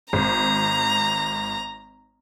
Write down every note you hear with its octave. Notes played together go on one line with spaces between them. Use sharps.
G#1 A#5